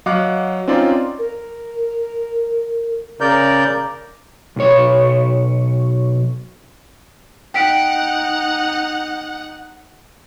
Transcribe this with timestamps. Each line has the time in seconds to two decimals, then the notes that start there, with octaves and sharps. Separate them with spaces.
0.06 F#3 D#5 F5 F#5 D6 F#6
0.68 C4 C#4 D#4 F4 D5 C6
1.18 A#4
3.21 C#3 A#4 D5 G6
4.56 B1 C#5
7.54 D#4 F#5 G5 B6 D7